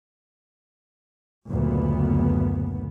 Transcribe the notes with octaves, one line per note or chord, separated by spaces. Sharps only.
F#1 D2 A#2 B3